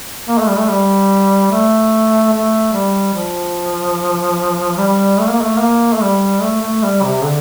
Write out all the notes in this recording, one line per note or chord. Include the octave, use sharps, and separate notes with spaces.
A#3
A3
G3
A3
G3
A3
A3
G3
F3
G3
A3
A#3
A3
A#3
A3
G3
A3
A3
G3
C3
D3